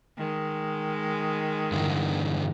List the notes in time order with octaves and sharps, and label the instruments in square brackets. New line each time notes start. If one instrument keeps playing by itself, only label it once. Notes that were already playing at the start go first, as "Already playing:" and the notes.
[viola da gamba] D#3 G#3
[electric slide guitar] G2 D3 E3